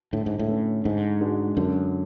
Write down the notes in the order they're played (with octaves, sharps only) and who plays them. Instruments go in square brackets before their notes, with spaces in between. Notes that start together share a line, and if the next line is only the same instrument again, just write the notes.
[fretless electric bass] A2 [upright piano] D3
[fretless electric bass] G#2
A2
[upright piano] A3 C#4
[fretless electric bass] G#2 [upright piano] D3
[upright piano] G#3 D4 F#4
[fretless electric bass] F#2 [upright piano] D3